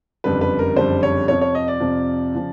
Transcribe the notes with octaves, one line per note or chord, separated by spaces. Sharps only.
F#1 F2 D3 G3 B4
B4
A#4
F#1 F2 D3 G3 C5
C#5
F2 C3 F3 C#5
C#5
D#5
D5
F2 C3 F3
C#3 F3